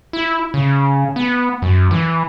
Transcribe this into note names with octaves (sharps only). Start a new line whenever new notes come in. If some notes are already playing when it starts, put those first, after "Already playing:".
E4
C#3
B3
F#2
E3